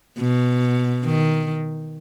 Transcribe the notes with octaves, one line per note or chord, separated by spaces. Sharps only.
B2
D#3